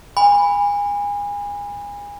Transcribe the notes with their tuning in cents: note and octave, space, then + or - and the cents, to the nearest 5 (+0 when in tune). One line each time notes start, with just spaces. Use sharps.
G#5 -30 B5 +0